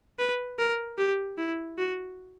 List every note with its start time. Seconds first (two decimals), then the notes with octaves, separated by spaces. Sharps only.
0.19 B4
0.59 A#4
0.98 G4
1.38 E4
1.78 F#4